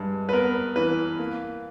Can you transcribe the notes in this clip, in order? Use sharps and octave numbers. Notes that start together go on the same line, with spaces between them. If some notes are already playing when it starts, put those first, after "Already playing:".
Already playing: G2 G#3
B4
B3 A#4
E3 B4
A#3